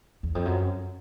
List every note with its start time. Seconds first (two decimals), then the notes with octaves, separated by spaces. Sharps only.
0.23 E2
0.35 F2
0.45 F#2